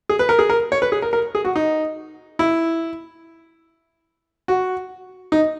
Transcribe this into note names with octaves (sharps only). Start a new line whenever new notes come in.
G#4
B4
A#4
G#4
A#4
C#5
B4
G#4
A#4
A#4
G#4
F#4
D#4
E4
F#4
D#4